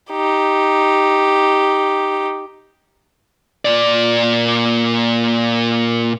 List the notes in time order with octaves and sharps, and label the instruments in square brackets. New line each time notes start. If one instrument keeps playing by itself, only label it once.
[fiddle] D#4 G4
[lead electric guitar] A#2 D5